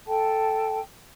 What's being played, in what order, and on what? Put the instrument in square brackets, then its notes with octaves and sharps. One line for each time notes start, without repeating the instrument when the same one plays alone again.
[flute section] A4 G5 A5